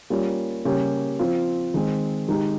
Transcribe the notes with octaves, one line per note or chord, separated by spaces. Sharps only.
G3 A#3 C#4 F4
C#3 G3 A#3 C#4 G4
F3 C4 F4
D#3 G#3 C4
D#3 G#3 D#4 G4